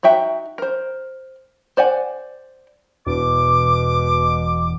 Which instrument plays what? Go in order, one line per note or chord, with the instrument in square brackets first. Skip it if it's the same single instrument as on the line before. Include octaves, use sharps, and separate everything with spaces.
[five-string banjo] D#4 F#4 E5 G5
A#4 C5
C5 D5 F#5 G#5
[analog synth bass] E1 [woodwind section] B2 D6